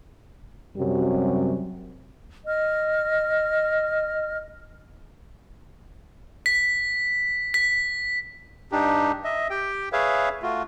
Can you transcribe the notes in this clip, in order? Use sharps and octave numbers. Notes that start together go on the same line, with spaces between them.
F#2 C3 F#3 G3
D#5 F6
B6
B6
G2 D4 D#4 G4
D#5 E5
G4 G5
G#4 B4 C#5 E5 F5
A3 F4 F#4